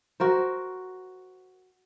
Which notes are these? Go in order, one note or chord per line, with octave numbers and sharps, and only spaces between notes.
F#4 A#4 C5